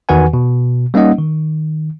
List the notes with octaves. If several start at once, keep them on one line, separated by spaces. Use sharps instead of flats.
E2 D#3 F#4 B4 F#5 G#5
B2
G3 A#3 C#4 D#4 D#5 F#5
D#3